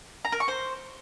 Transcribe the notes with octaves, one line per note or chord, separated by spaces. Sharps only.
A#5
A#4
C#6
C5